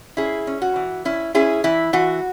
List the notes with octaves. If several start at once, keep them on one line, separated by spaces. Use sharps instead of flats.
C#4 E4 G#4
C#4
F#4
E3
C#4 E4
C#4 E4 G#4
E3 E4
E3 F#4